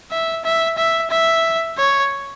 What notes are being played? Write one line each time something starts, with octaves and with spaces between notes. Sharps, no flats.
E5
E5
E5
E5
C#5